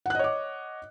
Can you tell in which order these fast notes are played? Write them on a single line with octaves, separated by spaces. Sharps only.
F#5 F#6 D#5 C#5 D6